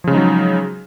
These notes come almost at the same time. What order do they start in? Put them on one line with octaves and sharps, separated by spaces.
F3 C#3 G#3 D#4 F#3